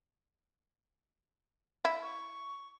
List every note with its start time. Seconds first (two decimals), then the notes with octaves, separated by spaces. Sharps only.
1.85 E4
2.03 C#6